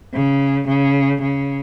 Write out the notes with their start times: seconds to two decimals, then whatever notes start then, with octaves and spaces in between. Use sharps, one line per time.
0.14 C#3
0.67 C#3
1.22 C#3